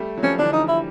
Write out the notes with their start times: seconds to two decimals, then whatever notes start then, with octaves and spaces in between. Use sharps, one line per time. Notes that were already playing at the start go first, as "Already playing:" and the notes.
Already playing: G3 A3
0.17 F#3
0.23 F3 G3 C#4
0.38 D3 E3 D4
0.53 D#4
0.68 E4